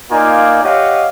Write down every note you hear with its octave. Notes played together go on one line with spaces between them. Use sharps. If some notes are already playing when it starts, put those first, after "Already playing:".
A#3 D#4 F4 D5 G#5
G4 C#5 D#5 F5 F#5